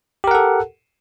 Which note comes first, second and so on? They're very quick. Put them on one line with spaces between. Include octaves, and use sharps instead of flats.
G4 A#4 F#5 A4